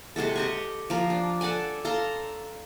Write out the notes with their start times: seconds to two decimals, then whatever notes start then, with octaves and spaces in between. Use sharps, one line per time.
0.16 C3 G#3 F#4 A4
0.36 G4 D#5 C#6
0.90 F3 A#4
1.10 D4
1.41 A4 D5 F#5 G#5
1.85 A4 F5 A#5 C6